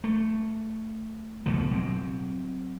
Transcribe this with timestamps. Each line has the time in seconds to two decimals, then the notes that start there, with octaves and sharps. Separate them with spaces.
0.04 A3
1.46 F#1 D2 B2 F3
1.71 F#3 C4